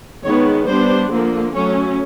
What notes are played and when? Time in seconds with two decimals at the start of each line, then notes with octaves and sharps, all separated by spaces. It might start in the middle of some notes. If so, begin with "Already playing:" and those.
0.24 D#3 G#3 B3 C#5
0.67 G3 B3 D4 C5
1.11 D3 F3 A#3
1.54 F#3 A3 C#4 C#5